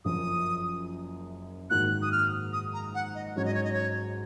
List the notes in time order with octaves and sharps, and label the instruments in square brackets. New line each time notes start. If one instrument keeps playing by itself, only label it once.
[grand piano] F#1 F#2 F3 [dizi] D#6
[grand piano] G#2 D#3 A#3 D#4 F#4 [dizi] F#6
[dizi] D#6
F6
D#6
A#5
F#5
D#5
[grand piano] G#2 F#3 C#4 [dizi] C#5
[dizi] D#5
C#5
D#5
C#5